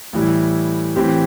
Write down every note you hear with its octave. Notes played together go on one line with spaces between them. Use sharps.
A2 E3 G3 E4
A2 E3 C4 G4